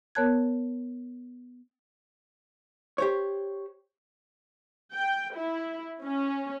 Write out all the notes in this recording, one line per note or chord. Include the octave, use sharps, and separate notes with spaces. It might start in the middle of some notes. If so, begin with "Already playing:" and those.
B3 A#4 C#5 A5 F#6 G#6
G4 C5 C#5
G5
E4
C#4